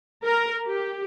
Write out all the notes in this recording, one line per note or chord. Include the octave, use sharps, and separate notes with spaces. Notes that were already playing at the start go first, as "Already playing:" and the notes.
A#4
G4